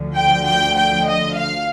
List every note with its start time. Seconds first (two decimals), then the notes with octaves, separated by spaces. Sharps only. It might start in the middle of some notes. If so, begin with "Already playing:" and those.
Already playing: D2 D3 F3
0.16 G5
0.47 G5
0.76 G5
1.06 D#5
1.37 F5